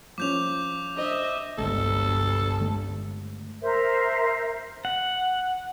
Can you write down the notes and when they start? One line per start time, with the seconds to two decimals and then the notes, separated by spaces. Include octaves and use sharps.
0.18 F3 C#4 D6 G6 F7
0.97 D4 C5 D#5 E5
1.58 G1 C2 G#3 A#3 A4
2.61 D3 G#3 A3
3.61 A#4 C5 E5
4.85 F#5